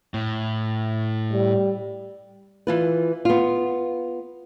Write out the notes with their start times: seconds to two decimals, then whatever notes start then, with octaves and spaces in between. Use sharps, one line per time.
0.14 A2
1.33 G3
2.67 E3 F4 B4
3.25 B3 F4